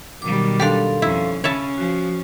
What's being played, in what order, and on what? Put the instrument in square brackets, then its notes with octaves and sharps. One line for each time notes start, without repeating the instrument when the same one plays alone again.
[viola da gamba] B2 D#3 [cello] F#3 G3 [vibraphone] D6
[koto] D4 G4 [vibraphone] A4 F5 C6
[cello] F2 [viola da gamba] C#4 [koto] E4
[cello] C#3 [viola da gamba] C#4 [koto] C#5 E5 A5 [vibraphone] B5
[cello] F3 [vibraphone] F#4